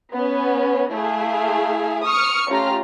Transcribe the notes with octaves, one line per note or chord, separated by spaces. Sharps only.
B3 C#4 B4
A3 E4 G#4 E5 F5
C#6 D#6 F6 C#7
A3 C#4 F4 G4 A#5 F6